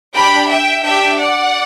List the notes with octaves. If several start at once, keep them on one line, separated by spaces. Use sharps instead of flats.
D4 G4 G5 B5
E5 G5
D4 G4 E5 G5
D5 F#5